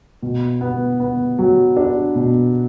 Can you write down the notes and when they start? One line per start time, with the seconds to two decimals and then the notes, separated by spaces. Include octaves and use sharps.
0.22 B2
0.61 B3
1.00 B3
1.39 F#3
1.77 D4
2.16 B2